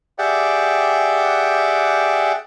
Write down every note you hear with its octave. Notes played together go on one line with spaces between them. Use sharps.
G4 G#4 D5 E5 F#5 G5